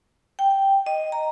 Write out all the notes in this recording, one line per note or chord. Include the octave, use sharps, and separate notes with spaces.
G5
D#5
A#5